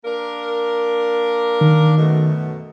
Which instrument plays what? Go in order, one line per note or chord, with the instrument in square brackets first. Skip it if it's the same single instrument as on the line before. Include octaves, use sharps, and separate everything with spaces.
[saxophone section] A#3 D4 A#4
[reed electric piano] D#3
[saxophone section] F#2 B2 A3